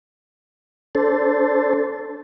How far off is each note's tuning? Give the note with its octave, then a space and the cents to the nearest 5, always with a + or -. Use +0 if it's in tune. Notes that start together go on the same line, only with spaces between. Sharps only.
D4 -30 A4 +0 C5 -10